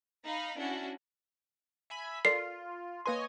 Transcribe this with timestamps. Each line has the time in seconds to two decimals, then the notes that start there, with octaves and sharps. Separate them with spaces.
0.25 D#4 F5 B5
0.57 C#4 D4 E4 F#4
1.90 E5 G#5 B5
2.25 F4 A4 A#4 D5 C7
3.06 A#3 B4 C#5 D#5 G#5 C6